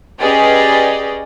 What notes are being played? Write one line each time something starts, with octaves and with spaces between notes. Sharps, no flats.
C#4 G4 G#4 B4 D5 D#5